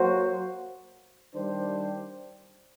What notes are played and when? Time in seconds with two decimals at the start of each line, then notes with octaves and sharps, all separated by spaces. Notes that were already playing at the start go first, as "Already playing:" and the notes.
Already playing: F#3 A#3 F#4 C5
1.34 D#3 G3 D4 G4 C5